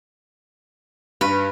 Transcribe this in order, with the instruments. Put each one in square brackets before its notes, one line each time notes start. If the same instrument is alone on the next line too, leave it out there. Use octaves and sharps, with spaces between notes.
[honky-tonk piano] G2 [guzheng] B4